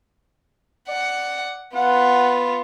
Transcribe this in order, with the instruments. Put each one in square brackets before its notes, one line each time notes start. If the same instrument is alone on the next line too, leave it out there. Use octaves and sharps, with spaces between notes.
[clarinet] D5 [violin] F#5
[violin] B3 F4 [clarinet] F#5